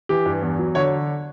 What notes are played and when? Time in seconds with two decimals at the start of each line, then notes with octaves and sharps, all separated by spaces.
0.09 E3 G4
0.26 G2
0.42 E2
0.59 F#3
0.75 D3 C#5